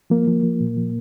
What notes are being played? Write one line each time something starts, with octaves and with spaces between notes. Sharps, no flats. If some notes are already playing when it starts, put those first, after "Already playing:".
F3 A#3
F3
F3
A#2
F3